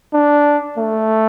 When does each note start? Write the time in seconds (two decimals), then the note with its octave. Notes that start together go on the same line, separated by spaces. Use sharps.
0.14 D4
0.78 A3